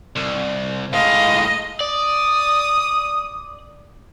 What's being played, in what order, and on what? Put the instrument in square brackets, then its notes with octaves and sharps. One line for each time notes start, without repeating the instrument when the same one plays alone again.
[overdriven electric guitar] C2
[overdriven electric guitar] A2 G#3 [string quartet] D#5 [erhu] F5
[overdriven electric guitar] D5 [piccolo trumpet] D#6